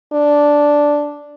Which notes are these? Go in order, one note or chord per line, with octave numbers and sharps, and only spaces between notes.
D4